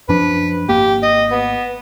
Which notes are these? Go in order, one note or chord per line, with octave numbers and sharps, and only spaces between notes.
F#2 F3 D4 B4
G#1 A#3 G4
D#5
B3